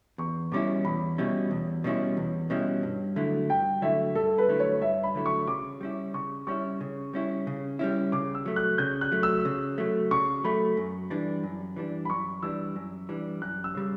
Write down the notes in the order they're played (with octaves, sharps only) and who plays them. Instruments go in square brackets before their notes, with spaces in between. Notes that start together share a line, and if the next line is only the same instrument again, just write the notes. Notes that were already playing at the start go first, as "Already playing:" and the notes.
[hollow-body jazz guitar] E2 [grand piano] C#6
[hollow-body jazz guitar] B2 G3 C#4 E4 [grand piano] D6
[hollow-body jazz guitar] E2 [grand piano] B5
[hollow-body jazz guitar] B2 G3 C#4 E4
E2
B2 G3 C#4 E4
E2
B2 G3 C#4 E4
G2
D3 F#3 A3 E4
[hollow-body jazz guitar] G2 [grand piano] G5
[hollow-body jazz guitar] D3 F#3 A3 E4 [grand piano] E5
[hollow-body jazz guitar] G2 [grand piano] A4
[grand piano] B4
[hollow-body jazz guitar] D3 F#3 A3 E4
[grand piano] C#5
[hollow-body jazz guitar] G2 [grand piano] E5
[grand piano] B5
[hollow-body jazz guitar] D3 F#3 A3 E4
[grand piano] C#6
[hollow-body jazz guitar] C#3 [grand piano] D6
[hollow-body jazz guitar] G3 C#4 E4
[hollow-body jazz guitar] C#3 [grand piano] C#6
[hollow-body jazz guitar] G3 C#4 E4 [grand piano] C#6
[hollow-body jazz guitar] C#3
G3 C#4 E4
C#3
G3 C#4 E4
[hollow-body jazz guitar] C#3 [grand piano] D6
[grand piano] E6
[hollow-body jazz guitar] F#3 A3
[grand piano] F#6
[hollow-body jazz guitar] C#3 [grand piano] G6
[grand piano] F#6
[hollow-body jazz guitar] F#3 A3
[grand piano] E6
[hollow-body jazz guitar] C#3
F#3 A3
[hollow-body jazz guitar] C#3 [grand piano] C#6
[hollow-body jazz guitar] F#3 A3 [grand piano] B5
[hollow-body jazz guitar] F#2
E3 G3 D4
F#2
E3 G3 D4
[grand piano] B5
[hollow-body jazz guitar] F#2 [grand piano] C#6
[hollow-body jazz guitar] E3 G3 D4 [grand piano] E6
[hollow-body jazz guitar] F#2
E3 G3 D4
[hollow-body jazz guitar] F#2 [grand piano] F#6
[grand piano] E6
[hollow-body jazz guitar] C#3 G3